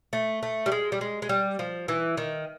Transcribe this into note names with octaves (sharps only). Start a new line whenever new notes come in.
A3
A3
G3
G#3
G3
G#3
G#3
G3
F3
E3
D#3